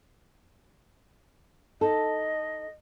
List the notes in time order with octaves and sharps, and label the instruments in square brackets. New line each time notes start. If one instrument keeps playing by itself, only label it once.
[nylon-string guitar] D#4 A4 [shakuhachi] D#5